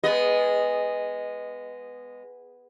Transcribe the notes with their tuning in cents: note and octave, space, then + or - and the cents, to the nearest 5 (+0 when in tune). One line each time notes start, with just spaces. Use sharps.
G#3 -15 B3 +5 D#5 +0